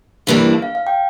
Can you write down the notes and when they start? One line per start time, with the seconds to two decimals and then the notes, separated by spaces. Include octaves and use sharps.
0.27 G2 E3 A#3 D4
0.62 F5
0.75 F5
0.87 G5